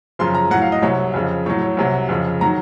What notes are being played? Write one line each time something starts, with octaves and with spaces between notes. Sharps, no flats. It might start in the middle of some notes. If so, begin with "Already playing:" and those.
F#2 C#3 F3 C6
A#5
A2 F#3 F#5
F5
D#5
C2 C3 F#3 C#5
F2 C#3 F3
A2 F#3 C#5
C#5
C2 C3 F#3
F2 C#3 F3
D#3 F#3 A#5